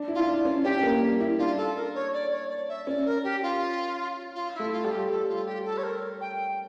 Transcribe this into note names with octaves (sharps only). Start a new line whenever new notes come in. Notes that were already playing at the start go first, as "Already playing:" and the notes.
Already playing: D4
E4
F4
E4
D4
C#4
C#4 G4
C#4
A#3
G3
E4
D4 F4
A4
A#4
C#5
D5
C#5
D5
E5
C#4 D5
A#4
G4
F4
F4
E4
A3
F4
G3 A4
G4
G3 A4
F4
G4
A4
C#5
A#4
G5